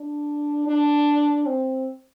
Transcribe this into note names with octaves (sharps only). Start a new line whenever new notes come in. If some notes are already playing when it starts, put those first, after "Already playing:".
Already playing: D4
D4
C4